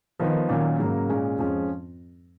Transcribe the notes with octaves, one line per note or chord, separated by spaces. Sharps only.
D#3 F3 B3 D#4
A#2 D#3 F#3 C#4
G#2 C#3 F#3 A#3
A#2 G#3 C#4
F2 F3 G#3 C#4